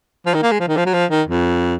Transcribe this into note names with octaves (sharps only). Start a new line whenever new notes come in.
F3
D#3
A#3
G#3
F3
D#3
F3
F#3
F3
D#3
F2